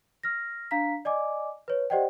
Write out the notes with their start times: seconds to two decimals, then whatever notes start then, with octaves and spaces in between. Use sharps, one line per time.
0.23 F6 A#6
0.71 D4 F5 A#5 B6
1.05 D5 D#5 G#5 D6
1.68 B4 C#5
1.90 G4 C5 D5 D#5 F#5 G5